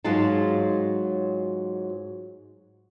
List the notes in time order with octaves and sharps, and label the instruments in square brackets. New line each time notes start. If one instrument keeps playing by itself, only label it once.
[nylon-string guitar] G#2 F#3 G#3 F4 A5